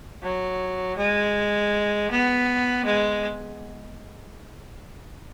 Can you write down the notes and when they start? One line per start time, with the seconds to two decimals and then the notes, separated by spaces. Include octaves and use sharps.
0.22 F#3
0.97 G#3
2.11 B3
2.85 G#3